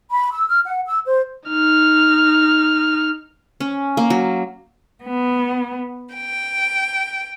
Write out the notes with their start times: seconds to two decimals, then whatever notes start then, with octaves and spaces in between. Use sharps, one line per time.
0.12 B5
0.33 E6
0.49 F6
0.65 F#5
0.86 E6
1.06 C5
1.48 D#4 F6
3.60 C#4
3.97 A#3
4.10 F#3
5.04 B3
6.14 G5